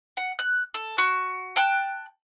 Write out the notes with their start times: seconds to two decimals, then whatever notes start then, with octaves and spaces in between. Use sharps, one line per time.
0.17 F#5
0.39 F#6
0.74 A4
0.98 F#4 C#6
1.56 G5 A5 F#6